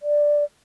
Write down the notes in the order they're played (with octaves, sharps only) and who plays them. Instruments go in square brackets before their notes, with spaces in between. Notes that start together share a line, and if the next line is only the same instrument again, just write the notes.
[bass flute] D5